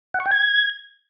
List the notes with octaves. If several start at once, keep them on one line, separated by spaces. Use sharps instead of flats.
F#5
C#6
G5
G#6